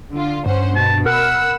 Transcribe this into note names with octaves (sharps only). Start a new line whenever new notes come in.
D3 F4
G2 C#4 C5 F#5
B2 A5
A#4 F#5 B5 E6